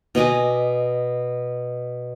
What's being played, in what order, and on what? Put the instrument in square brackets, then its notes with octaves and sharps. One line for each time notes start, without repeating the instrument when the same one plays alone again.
[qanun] B2 D#5 G#5 D6